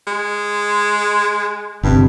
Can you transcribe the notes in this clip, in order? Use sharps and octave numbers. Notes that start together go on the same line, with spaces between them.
G#3
G1 G2 C3